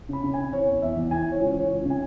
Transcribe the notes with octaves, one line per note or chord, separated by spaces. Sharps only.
C#3 B5
C#3
C#3 G#5
E3 C#5
E2
E2 E5
E2
E3 G#5
E3
C#5
C#2
E3 C#5
C#2
C#3
G#5